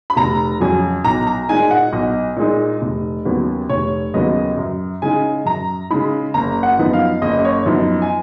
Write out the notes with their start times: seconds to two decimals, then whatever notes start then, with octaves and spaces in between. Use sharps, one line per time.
0.10 B5
0.17 F1 A#5
0.60 F2 C#3 F#3 G#5
1.05 B1 A#5
1.27 A#5
1.49 A#2 G#3 D#4 G#5
1.71 F#5
1.93 B1 D#5
2.37 A#2 G#3 D#4
2.82 F1
3.25 D#2 C#3 F#3 B3
3.69 F1 C#5
4.14 D#2 C#3 F#3 B3 D#5
4.57 F#2
5.02 C#3 G#3 D#4 G#5
5.45 F#2 A#5
5.90 C#3 G#3 D#4 B5
6.34 F#1 A#5
6.63 F#5
6.79 F#2 F3 B3 D#4
6.93 F5
7.22 F#1 D#5
7.39 D#5
7.45 C#5
7.66 F#2 F3 B3 D#4
8.02 G#5